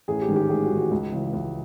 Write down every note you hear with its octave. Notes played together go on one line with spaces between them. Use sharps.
A1 G#4
G4
G#2 D#3
G4
A1 G#4
F#4
G#2 D#3
F#4
C#2
C#3 E3
C#2